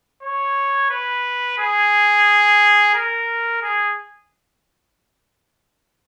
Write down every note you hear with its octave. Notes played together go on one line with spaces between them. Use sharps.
C#5
B4
G#4
A#4
G#4